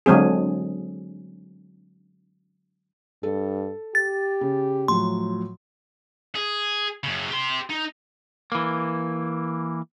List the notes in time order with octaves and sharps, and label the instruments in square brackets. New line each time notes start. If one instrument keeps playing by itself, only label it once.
[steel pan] D3 F#3 G#3 C4 G#4
[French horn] G2 [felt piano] A4
[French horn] G4 [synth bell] A6
[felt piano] C#3
[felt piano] A2 F3 F#3 [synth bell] C6
[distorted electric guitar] G#4
F#2 C#3
G4 C6
D#4
[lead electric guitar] E3 A#3